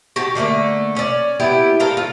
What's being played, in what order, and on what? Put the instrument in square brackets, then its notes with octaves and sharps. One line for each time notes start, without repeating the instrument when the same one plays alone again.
[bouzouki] F#4 G4 A5
D3 G3 A3 A#3
C#4 D5
B3 E4 G4
A4 A#4 F5
F4